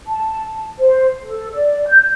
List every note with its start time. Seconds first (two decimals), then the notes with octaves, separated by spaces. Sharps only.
0.07 A5
0.79 C5
1.22 A4
1.53 D5
1.89 G6